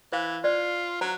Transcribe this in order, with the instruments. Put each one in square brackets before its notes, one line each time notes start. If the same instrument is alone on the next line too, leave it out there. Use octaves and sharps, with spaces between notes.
[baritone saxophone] E3 [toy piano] C5 F5
[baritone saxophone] F4 [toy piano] C5 D5
[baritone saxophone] F#3 [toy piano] C5 A#5